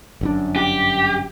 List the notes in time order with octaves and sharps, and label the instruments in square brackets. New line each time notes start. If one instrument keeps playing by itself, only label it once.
[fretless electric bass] G1 F#2 D4
[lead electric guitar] G4